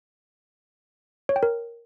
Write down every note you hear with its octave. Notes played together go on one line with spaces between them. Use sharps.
C#5
G5
A#4